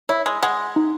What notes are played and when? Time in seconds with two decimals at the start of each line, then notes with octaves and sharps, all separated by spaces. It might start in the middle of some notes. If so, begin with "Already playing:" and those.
0.09 E4 C#5
0.26 G#3
0.43 G#3 F#5
0.76 D#4